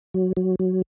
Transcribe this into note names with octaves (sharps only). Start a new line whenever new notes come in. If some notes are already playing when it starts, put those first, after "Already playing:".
F#3
F#3
F#3